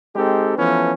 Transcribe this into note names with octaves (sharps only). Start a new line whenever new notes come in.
G#3 C4 D#4 G4 A4
E3 F3 A3 B3 C#4